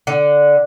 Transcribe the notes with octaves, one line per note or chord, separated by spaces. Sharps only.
D3